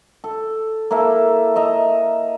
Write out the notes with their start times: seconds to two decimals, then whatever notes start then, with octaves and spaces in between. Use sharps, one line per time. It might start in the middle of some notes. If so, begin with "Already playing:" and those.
0.24 A4
0.91 A#3 E4 A4 E5
1.56 D#5 E5 A#5